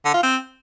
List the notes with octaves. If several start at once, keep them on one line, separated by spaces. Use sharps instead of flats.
D3
F4
C4